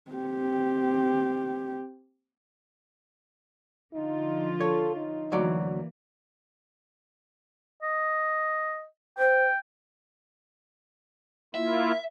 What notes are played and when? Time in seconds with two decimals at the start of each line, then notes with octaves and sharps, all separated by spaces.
0.11 C4 G4
3.94 D3 F3 D#4 F4
4.60 A4 C#5
4.97 D#4
5.32 D2 E3 F#3 A#3 D5
7.82 D#5
9.19 C5 G5
11.55 A#3 E4 F4 E5